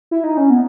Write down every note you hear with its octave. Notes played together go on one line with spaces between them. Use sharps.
E4
D#4
C#4
B3